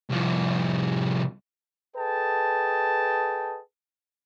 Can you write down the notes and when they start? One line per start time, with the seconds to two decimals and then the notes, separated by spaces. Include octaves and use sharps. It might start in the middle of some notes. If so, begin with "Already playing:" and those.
0.10 C2 F3
1.97 G#4 A4 B4 D#5 G5 A5